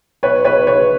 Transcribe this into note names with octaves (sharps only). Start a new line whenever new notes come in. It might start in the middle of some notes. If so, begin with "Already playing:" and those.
B1 B4 C#5
B1 B4 C#5
B1 B4 C#5